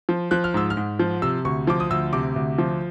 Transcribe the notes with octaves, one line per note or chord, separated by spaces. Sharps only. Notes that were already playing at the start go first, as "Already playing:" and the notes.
F3
F3 F#6
F6
G#2 E6
F6
G#2
F3
C3 E6
D2 C#6
F3 D6
D#6
D2 E6
C3 D6
D2
F3